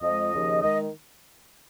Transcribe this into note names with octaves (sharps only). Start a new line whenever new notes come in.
F2 F3 G#3 D#5
D#2 C#3 F3
D#3 G#3 D#5